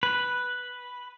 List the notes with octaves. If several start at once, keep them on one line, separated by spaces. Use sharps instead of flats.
B4